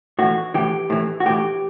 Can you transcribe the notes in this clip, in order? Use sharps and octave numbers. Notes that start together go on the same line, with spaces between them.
A2 E3 F#4
A2 E3 G4
A2 E3
F#4
A2 E3 G4